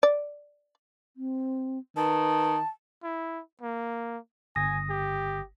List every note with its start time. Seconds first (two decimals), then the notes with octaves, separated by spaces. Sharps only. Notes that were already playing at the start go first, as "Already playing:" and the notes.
0.03 D5
1.17 C4
1.96 D#3 B4 A5
3.03 E4
3.62 A#3
4.56 G1 G#5 D#6 A#6
4.90 G4